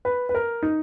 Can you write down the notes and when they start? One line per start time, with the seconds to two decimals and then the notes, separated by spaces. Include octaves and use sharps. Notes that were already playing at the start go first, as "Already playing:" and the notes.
0.05 B4
0.29 B4
0.35 A#4
0.63 D#4